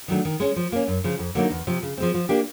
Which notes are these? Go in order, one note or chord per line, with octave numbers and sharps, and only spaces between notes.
D#3 F#3 A3 D4
D#3
G#3 C#4
F3
A#3 C#4
F#2
C#3 F3
F2
D3 F#3 A#3 D#4
E2
C3 F3
C#3
F3 G#3 C4
F3
A#3 D4 G4